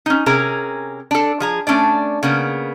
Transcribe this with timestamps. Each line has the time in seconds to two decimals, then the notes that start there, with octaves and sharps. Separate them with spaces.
0.06 C#4 D#4
0.26 C3 C#4 G#4 A#4 A#5
1.11 D4 A4
1.40 F3 G#4 A#5
1.67 A3 C#4 D4 D5
2.23 C#3 A#3 B3